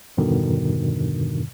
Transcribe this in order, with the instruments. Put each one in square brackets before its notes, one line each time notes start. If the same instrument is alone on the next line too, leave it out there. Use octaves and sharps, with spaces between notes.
[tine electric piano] E2 G2 B2 D3 D#3